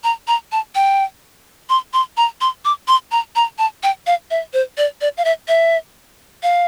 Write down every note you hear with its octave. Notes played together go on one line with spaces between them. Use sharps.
A#5
A#5
A5
G5
C6
C6
A#5
C6
D6
C6
A#5
A#5
A5
G5
F5
E5
C5
D5
D5
F5
E5
E5
F5